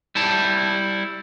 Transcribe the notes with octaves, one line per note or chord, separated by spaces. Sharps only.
G3 E4 A5